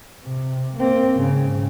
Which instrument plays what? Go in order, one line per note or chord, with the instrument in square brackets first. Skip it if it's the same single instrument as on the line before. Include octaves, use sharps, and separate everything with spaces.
[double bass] C3
A#3 C4
G#2 C#3